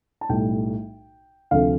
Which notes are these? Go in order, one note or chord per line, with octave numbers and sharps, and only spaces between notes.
A5
B1 A2 G3 G5
D2 C3 F3 A3 F5